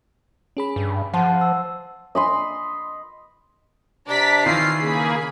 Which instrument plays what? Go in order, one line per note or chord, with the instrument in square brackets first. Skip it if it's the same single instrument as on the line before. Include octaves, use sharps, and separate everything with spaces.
[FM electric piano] C#4 G#4 B5
[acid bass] G2
[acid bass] F3 [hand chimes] F#5 A5 C6
[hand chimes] E6
[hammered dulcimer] D#5 B5 C6
[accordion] C3 D4 [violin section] D5 A#5 B6
[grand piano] D#3 E3 [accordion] F4 [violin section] C7
[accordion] C#3 [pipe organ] A#3 G#4 [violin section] B5